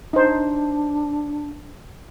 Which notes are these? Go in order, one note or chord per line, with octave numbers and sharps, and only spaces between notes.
D4 D#4 C5